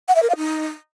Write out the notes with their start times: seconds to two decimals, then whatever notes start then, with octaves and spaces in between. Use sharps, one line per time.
0.08 F#5
0.15 E5
0.22 A#4
0.30 F5
0.37 D#4